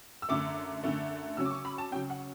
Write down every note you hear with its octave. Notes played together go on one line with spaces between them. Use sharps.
E6
F#2 D3 A3 D6
F#2 D3 A3
C#3 F#3 C#4 E6
D6
C#6
B5
A5
C#3 F#3 C#4 G5
F#5